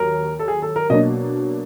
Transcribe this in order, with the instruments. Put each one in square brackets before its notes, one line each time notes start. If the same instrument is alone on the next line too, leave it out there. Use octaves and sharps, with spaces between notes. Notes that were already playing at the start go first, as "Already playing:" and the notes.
Already playing: [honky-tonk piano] D#2 F#3 [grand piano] A#4
[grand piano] A4
G#4
A4
A#4
[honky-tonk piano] B2 F#3 A#3 D4 [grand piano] D#5